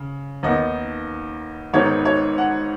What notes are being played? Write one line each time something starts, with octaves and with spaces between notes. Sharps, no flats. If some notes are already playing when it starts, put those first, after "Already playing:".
Already playing: C#3
D#2 D#3 B3 D#4 D#5
G#1 G#2 D#3 B3 D#4 C#5
C#5
F#5